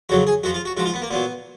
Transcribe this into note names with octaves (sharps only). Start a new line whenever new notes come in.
F2 C#3 F#3 F#4
G#4
F2 F3 F#4
F4
F#4
G#2 F3 F#4
F4
B3
A#3
A#2 F#3 B3